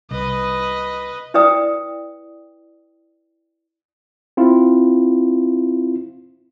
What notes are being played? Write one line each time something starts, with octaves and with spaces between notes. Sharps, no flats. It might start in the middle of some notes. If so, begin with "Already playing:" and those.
C2 B4 D#5
E4 B4 D5 G5 D#6
C4 E4 F4